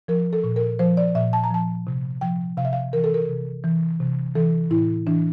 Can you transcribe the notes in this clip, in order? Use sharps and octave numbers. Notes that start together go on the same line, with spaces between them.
F3 A#4
A4
A#2
A#4
F3 C5
D5
A#2 E5
A5
A#5
F3 A5
C3
F3 G5
C3 F5
E5
F5
E3 A#4
A4
A#4
C3
E3
C3
E3 A4
A2 E4
E3 D4